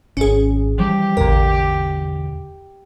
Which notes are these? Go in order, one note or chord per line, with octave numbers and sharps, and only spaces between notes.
G#1 C#4 G#4
E3 F3 G3 G4
A1 E2 B2 D3 A#4